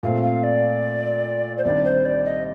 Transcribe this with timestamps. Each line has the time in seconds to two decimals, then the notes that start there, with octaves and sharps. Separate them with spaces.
0.03 A#2 A3 C4 F5
0.23 F5
0.43 D5
1.58 C5
1.65 C2 C3 D#3 G3 D4 D5
1.85 C5
2.05 D5
2.25 D#5